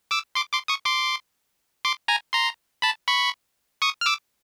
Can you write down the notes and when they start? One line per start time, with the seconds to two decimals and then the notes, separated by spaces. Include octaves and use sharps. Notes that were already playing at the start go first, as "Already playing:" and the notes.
0.11 D6 E6
0.35 C6 D6
0.52 C6 D6
0.68 C#6 D#6
0.85 C6 D6
1.85 C6 D6
2.08 G#5 A#5
2.33 A#5 C6
2.82 A5 B5
3.08 B5 C#6
3.82 C#6 D#6
4.01 F6
4.06 D6 E6